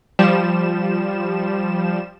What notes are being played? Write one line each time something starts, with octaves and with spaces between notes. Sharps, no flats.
F3 G3 E7